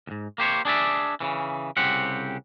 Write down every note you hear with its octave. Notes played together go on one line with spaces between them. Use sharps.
D2 G#2
A#3 G4 C5 C#5
D4 G#4 D5 E5
C#3 E3
C2 C#3 C4 G4 F#5